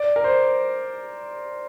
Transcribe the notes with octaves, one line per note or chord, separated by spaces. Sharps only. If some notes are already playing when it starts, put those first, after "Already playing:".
Already playing: D5
A#4
C5